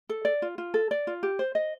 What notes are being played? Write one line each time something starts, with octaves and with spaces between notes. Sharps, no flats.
A4
D5
F4
F4
A4
D5
F4
G4
C5
D#5